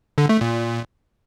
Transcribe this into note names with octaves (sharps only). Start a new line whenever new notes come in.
D3
A3
A#2